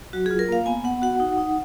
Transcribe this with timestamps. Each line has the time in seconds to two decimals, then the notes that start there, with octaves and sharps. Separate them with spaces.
0.13 F#3 F#4
0.26 F4 G#4
0.39 A#4
0.49 A#3 F5
0.66 B3 G#5
0.84 B3 F#5
1.02 F#4 F#5
1.20 D#4
1.38 D#4